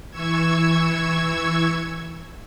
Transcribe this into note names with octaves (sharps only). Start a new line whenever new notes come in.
E3 C#6 E6 G#6